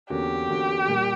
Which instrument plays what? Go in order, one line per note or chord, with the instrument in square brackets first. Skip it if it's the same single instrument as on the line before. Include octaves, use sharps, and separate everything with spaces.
[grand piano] E2 D3 A#3 C#4 F#4 [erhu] G4
[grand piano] E2 D3 A#3 C#4 F#4
A#2 G3 A#3